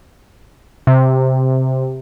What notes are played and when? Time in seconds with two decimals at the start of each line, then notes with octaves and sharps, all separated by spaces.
0.87 C3